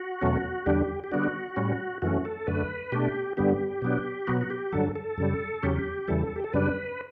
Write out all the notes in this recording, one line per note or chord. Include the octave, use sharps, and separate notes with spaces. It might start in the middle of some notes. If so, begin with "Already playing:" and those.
Already playing: F#4
E2 B2 F#3 A3 C#4
E2 D3 G3 D4 G4
G4
D3 G3 B3 D4 F#4
A2 G3 C#4
F#2 E3 A3 C#4 F#4
A4
F#2 D3 A3 B4
B2 A3 D4 G4
G2 D3 G3 B3 G4
B2 F#3 B3 D4
B2 F#3 B3 F#4
F#4
G4
G2 D3 F#3 A4
A4
F#2 C#3 G3
E2 C#3 F#3 C#4 G4
E2 C#3 E3 G3 A4
G4
A4
F#2 C#3 G3 D4 B4